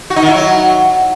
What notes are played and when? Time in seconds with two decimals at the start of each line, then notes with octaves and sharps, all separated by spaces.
0.10 F#4
0.16 D#4
0.22 D#3
0.29 E4
0.35 F#3